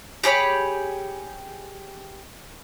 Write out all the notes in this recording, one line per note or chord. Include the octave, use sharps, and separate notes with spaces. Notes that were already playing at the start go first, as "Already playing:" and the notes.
G4 G#4 C#5 B5